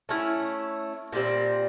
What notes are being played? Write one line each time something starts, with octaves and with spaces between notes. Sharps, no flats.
A3 C#4 E4
A#2 G3 C4